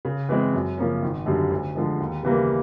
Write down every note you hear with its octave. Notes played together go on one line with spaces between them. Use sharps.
C#3
E3 G#3 C4
F#2
C#3 F3 A#3 C#4
G#1
F#2 D3 G3
D2
D3 F3 G#3
D#2
C#3 E3 G3 A#3